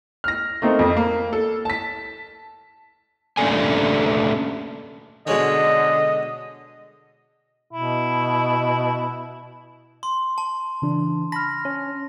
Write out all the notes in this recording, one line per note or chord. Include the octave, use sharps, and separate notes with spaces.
F6 A#6
A3 A#3 C4 D#4
F2
A#3
A4
A5 B6
A3 A#3 C#4 D4 A4 G#5
B2 D3 G#3 C#4 D#5
B2 E4
C6
A5
C#3 E3 D4
A5 B5 F6 A#6
C#4